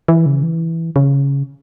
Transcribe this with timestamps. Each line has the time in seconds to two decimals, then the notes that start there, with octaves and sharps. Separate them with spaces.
0.08 E3
0.26 C#3
0.43 E3
0.96 C#3